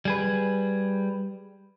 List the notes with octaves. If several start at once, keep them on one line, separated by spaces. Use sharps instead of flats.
G3 G#4 B4